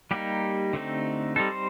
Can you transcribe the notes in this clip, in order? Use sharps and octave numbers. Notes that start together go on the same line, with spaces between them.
G3 A#3 D#4 G4
D3 A3 C4 D#4
G3 C4 D#4 A4
C5